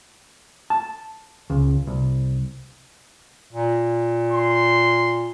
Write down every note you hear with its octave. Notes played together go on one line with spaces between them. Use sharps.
A5
C#2
C2
A#2
C6